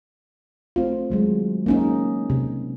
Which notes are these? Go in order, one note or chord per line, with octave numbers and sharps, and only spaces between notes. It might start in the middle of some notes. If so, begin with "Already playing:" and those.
A3 C4 F4
D#3 F#3 G#3
A#3 C#4 D#4
C3